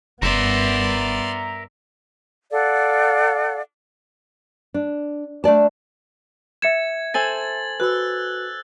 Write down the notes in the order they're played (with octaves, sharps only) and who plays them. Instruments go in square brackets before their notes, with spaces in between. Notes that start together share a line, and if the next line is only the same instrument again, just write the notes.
[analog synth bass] F#1 [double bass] G2 B3 [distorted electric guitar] A#4 E5 [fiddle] D5 C6
[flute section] A4 D5 F5 F#5
[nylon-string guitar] D4
A3 D4 D5 A5
[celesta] E5 C#7 E7 [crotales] G#6
[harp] A4 C5 G#5 [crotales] A6 F#7
[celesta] F#4 B4 [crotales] E6 F#6